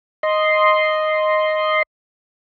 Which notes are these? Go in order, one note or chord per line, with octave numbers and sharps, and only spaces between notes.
D#5 C6